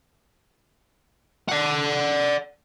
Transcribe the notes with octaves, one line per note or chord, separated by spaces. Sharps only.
D5 F#5